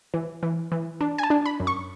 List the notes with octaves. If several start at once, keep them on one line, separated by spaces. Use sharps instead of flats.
E3
E3
E3
D4
G#5
A5
D4
B5
F#2
C#6